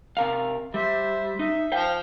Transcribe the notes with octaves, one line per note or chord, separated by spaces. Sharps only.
C3 A#4 F5
G3 C5 E5
D#4 E5
F3 C5 F5 G5